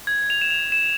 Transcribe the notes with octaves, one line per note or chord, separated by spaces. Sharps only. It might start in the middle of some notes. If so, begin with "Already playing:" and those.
G#6
F7
E7
F7
E7